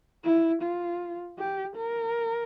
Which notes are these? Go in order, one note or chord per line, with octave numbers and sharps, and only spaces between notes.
E4
F4
G4
A#4